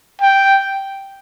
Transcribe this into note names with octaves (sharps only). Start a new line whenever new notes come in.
G5